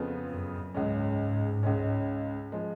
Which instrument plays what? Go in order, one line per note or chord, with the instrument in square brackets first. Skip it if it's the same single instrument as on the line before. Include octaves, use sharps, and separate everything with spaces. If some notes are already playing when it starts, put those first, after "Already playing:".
Already playing: [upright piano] F2 C#3 F3 B3 F4
[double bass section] F#2
[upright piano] C#2 C#3 G#3 C#4 [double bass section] G#2
[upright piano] C#2 C#3 G#3 C#4
F3 G#3